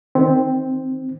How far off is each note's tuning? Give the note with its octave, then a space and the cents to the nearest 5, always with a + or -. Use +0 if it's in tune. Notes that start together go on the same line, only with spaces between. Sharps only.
D#3 +0 C4 +0